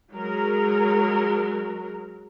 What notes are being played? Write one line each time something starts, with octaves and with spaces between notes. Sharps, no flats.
F#3 G#3 A#4